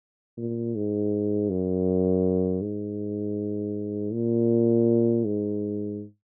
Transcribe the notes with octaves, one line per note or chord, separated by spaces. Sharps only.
A#2
G#2
F#2
G#2
A#2
G#2